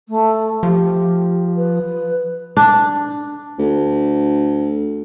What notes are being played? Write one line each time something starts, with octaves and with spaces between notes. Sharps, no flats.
A3
F3 G4
B4
D4
D2